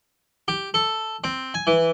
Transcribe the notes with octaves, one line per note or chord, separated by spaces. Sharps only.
G4
A4
C4
G#5
E3